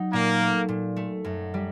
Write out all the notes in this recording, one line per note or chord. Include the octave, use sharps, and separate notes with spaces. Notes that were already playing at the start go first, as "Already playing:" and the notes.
Already playing: F#3 D#4
A#2 A#3
A3
A#2
A3
F#2
G3